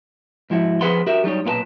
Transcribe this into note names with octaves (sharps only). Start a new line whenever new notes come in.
G#2 F3 E4 F#4
F3 G#4 B4 F#5 B5 C6
F#4 G4 A#4 E5
F#3 G3 D#4 C#5
B1 A#2 F4 B4 A5